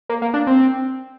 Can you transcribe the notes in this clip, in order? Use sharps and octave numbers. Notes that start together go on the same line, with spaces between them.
A#3
A#3
D4
C4